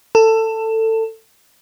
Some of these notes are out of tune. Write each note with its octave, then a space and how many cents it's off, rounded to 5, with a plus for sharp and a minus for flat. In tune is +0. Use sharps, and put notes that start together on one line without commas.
A4 +20